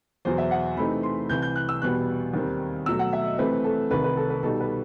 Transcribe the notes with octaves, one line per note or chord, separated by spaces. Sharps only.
E2 B2 F#3 C5
E5
F#5
C3 E3 A3 C4 D#4 B5
C6
C2 C3 E3 G6
G6
F#6
E6
E2 B2 G3 B3 F#6
D#2 D#3 G3 C4
B2 F#3 A3 E6
F#5
E5
D#5
C3 E3 A3 C4 B4
A4
C2 C3 D#3 B4
B4
A4
B4
B2 G3 D#4 A4
B4